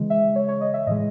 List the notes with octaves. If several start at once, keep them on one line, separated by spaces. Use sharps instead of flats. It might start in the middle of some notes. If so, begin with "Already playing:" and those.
Already playing: C#3 E3 G#3
E5
C#5
C#5
D#5
E5
A2 E3 G#3 D#5